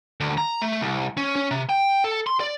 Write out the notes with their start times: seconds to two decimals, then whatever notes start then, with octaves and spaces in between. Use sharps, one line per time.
0.20 D2
0.38 A#5
0.62 A3
0.81 C2
1.17 C#4
1.36 C#4
1.51 C3
1.69 G5
2.04 A4
2.27 C6
2.40 D5